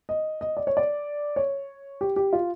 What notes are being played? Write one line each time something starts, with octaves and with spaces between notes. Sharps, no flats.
D#5
D#5
D5
C#5
D5
C#5
G4
G4
F4